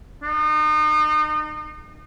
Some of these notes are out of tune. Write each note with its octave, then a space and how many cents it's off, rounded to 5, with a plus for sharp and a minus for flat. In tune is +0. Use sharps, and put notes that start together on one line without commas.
D#4 -35